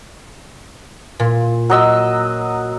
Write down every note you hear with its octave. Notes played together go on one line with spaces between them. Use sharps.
A#2
F#3 D#5 E6